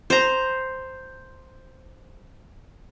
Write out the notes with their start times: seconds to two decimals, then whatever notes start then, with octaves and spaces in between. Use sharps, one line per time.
0.10 C5 A#5